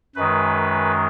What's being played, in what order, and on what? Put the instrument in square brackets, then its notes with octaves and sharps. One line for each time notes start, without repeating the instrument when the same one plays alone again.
[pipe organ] F#2 D#3 G#3 B4